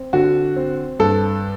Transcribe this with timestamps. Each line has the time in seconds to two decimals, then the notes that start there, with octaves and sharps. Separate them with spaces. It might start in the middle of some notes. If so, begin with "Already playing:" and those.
Already playing: C4
0.13 D3 F#4
0.56 C4
0.99 G2 A4